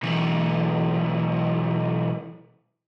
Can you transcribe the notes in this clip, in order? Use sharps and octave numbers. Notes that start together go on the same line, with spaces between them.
B1 E3